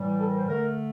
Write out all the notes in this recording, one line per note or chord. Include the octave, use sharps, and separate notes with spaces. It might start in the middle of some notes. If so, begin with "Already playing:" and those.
Already playing: A2 E3 G3
A4
A#4
C5
D3 A3 A#4